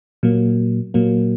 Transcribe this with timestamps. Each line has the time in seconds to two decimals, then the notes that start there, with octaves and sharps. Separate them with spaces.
0.23 A#2 F#3 A#3
0.94 A#2 F#3 A#3